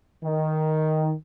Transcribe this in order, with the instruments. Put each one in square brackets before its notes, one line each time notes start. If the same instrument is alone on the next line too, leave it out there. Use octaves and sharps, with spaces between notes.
[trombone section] D#3